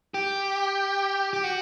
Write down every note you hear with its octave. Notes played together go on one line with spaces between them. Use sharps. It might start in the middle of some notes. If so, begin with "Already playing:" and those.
G4
G4
F#4